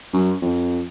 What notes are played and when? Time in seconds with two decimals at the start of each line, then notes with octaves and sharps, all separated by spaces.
0.13 F#2
0.42 F2